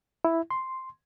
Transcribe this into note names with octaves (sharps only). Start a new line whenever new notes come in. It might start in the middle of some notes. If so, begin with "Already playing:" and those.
E4
C6